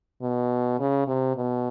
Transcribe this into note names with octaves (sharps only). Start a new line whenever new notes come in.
B2
C#3
C3
B2